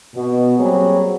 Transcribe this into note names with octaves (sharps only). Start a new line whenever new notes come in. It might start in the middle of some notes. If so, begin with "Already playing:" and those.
B2
F#3 G3 A#3 C4 G#4